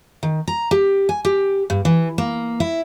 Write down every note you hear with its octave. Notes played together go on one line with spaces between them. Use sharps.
D#3
A#5
G4
G#5
G4
G2
E3
A#3
E4